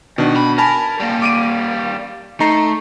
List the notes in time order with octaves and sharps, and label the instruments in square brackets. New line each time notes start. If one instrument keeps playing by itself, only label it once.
[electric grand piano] B2 D4 [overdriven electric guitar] D#3
[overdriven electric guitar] B5
[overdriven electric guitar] A#4 [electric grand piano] G#5 A5 B5
[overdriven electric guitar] G3 A#3
[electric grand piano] D6 D7 D#7
[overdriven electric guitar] A3 [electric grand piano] D#4 A#5 C7